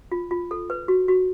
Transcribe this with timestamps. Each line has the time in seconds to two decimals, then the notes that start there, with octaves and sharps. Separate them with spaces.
0.12 F4
0.31 F4
0.51 A4
0.70 B4
0.88 F#4
1.08 F#4